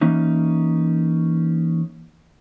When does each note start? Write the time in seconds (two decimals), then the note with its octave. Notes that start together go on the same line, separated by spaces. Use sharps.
0.01 E3 A#3 C#4 D#4